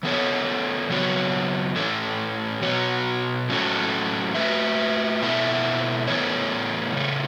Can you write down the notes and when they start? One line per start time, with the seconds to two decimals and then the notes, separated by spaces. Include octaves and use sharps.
0.03 E3 B3 A4 C#5
0.90 C#3 F#3 B3 F#4 C#5
1.76 A2 E3 C#4 A4 C#5
2.62 B2 B3 F#4 C#5
3.49 A2 F#3 C#4 F#4 A4
4.35 A3 F#4 B4 E5
5.21 B2 B3 E4 A4 E5
6.07 A2 E3 B3 A4 C#5
6.94 C#3 E3 A3